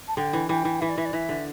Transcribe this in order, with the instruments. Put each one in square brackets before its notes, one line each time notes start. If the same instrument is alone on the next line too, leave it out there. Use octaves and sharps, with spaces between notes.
[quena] A5
[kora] D3 [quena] G5
[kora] E3
[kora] E3 [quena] G5
[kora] E3
[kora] E3 [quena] E5
[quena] D5
[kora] E3 [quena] E5
[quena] D5
[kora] E3 [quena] E5
[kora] D3